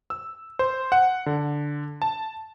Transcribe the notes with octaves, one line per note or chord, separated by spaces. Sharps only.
E6
C5
F#5
D3
A5